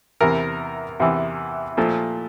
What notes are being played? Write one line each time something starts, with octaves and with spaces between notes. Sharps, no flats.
E2 C3 E3 A#4
E2 C3 E3
A#2 F3 A3